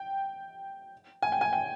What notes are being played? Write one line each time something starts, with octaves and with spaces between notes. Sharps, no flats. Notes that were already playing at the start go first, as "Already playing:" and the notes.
Already playing: G5
G#5
G5
G#5
G5